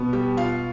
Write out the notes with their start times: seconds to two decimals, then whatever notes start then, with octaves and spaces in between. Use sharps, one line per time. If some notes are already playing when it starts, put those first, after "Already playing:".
Already playing: B2 B3
0.13 G3 G4
0.37 F4 F5